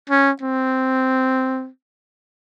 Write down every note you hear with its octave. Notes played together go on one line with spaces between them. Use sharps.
C#4
C4